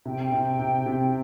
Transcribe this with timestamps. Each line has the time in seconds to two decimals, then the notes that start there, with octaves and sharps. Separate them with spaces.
0.05 C3 G5
0.32 C3
0.59 C3
0.86 C3